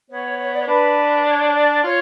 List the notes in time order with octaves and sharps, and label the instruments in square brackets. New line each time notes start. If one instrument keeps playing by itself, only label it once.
[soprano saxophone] B3 [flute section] C#5
[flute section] C#5
D5
C#5
[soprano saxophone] D4 [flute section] B4
[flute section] C#5
D5
[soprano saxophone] F4 [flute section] C#5